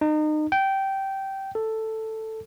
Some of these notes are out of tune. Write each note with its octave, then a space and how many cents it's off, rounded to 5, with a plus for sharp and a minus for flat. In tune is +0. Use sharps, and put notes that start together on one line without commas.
D#4 -30
G5 -15
A4 +5